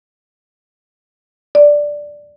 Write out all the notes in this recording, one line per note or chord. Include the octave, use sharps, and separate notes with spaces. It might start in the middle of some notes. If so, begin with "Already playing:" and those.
D5